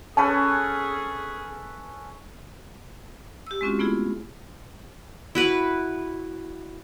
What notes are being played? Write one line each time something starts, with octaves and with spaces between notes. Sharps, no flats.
C#4 G#4 A4 B4 A5
G4 E6
G#3 C4 C#4 F4 F#4
A3 B3 E4 F4 G#4
E4 F#4 B4